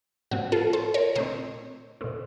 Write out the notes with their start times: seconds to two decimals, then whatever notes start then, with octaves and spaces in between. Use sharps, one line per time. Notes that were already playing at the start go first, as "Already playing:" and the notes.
0.31 A2 F3 C4 F#4
0.52 F4 A4
0.73 A4 C5
0.94 A#4 C#5
1.15 A#2 A3 C4 C5 D#5
2.01 A#2 A3 C4